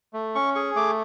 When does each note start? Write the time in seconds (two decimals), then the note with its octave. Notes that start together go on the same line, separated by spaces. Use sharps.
0.13 A3
0.35 C#4 C#6
0.55 G#4 C#6
0.76 A3 D6